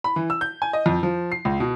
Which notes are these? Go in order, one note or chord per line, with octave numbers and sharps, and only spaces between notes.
B5
E3
E6
G6
G#5
D#5
F2
F3
C7
C#2
B2